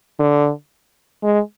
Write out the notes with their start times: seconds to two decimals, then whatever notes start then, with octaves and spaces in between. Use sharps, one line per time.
0.19 D3
1.23 G#3